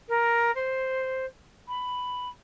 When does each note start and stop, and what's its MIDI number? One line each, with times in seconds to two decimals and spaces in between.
0.08 0.51 70
0.55 1.25 72
1.68 2.28 83